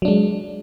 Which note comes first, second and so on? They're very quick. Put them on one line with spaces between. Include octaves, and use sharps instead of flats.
F#3 D4 G#3